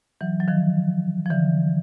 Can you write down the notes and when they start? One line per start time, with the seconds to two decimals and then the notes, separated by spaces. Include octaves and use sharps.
0.21 E3 F#3
0.40 F#3
0.48 D#3 F3
1.26 F3
1.30 D3 E3